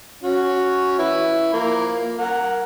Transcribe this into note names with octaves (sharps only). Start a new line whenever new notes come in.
C#4 F#4
E4 B4
F3 A#3
A#4 F#5